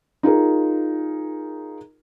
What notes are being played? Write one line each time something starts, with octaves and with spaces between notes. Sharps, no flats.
D#4 F4 G#4 A#4